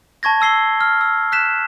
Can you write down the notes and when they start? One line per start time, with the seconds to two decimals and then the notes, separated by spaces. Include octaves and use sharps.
0.23 A5 C#6 G#6 A#6
0.41 A5 E6 C7 G7
0.81 F6
1.01 E6
1.32 F#6 B6 E7